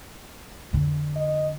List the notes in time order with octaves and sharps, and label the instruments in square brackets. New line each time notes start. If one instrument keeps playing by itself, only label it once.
[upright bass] F2 D3
[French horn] D#5